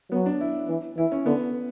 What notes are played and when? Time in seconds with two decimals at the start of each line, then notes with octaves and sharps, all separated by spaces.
0.12 F#3 B3
0.26 D4
0.41 E4
0.68 E3
0.97 E3 E4
1.12 C#4
1.26 D3 B3